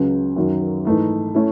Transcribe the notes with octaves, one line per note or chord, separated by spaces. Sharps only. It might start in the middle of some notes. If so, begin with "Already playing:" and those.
Already playing: C#2 C#3 F#3
F#2 D#3 F#3
G#2 E3 A3 D#4
A3 C#4 E4